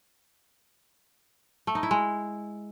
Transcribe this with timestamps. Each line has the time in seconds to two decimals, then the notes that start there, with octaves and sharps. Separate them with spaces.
1.67 A3
1.75 D#4
1.83 E4
1.91 G#3